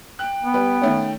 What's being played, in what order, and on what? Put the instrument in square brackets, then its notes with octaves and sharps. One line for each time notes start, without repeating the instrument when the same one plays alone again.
[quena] G5 [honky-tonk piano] F#6
[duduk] B3
[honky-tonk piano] G3 B4
D#3 A3 C#4